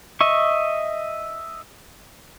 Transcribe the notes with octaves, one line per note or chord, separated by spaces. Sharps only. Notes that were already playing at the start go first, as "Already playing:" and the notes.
D#5 E5 C#6